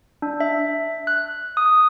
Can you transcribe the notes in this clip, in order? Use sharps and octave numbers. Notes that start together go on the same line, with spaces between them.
D4
E5
F#6
D#6